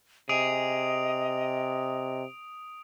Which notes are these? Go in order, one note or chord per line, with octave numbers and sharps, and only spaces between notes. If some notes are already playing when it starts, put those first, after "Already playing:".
C3 G#4 D#5 D#6 D7 F7